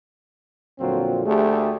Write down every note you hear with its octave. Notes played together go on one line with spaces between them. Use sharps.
F2 A#2 D3 F#3 C4 F4
D2 A3 G4 G#4